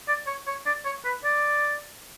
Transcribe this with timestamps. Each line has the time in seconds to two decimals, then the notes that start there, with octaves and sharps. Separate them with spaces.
0.08 D5
0.27 C#5
0.47 C#5
0.66 D5
0.85 C#5
1.05 B4
1.24 D5